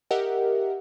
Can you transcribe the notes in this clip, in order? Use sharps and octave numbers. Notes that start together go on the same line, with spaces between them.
G4 A#4 D#5 E5 F#5